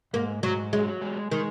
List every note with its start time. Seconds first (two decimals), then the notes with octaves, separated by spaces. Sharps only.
0.13 G#2 A#3
0.43 G#2 F#3
0.73 F#3 G#3
1.02 G#3
1.31 D#3 G#3